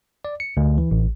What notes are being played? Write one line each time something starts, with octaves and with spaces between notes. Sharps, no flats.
D5
C#7
D2
E3
A1